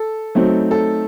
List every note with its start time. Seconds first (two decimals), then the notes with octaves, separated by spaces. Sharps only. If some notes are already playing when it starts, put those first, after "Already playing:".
Already playing: A4
0.35 F#3 A3 C4 D#4
0.71 A4